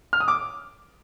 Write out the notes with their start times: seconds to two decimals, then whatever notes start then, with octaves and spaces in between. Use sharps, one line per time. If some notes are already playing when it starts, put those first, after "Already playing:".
0.13 F6
0.20 D#6
0.28 D6